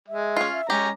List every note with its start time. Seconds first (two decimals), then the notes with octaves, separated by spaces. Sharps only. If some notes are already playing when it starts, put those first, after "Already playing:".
0.08 G#3 E5
0.37 C#4 F4
0.52 E5
0.70 G#3 C#4 G4 A#5